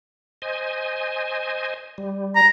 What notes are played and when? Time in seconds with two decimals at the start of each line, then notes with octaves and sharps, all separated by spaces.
0.42 C5 D#5 G#5
1.98 G3
2.36 A#5